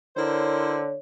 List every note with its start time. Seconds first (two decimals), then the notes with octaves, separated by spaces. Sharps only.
0.17 D3 E4 A#4 C5 C#5